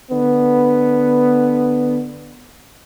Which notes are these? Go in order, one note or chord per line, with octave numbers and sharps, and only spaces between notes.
D3 B3